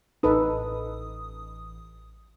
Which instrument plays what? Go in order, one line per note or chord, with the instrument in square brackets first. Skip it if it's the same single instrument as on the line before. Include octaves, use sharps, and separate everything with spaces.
[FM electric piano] A1 D#6 [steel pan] D#4 A4 B4